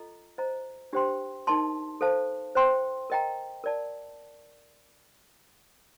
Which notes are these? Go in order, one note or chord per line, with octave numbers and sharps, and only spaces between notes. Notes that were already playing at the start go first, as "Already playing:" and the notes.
Already playing: F4 A4 D#5 A#5
C5 D#5 A#5
D4 G4 C5 G5 C6
D#4 A#4 D#5 A5 C6
A4 C5 F5 A5
C5 G5 C6
A#4 D#5 G5 A#5
A#4 D5 A5